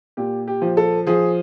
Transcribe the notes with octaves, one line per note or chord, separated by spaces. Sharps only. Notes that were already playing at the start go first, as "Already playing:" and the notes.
A#2 G4
G4
F3
A4
F3 G#4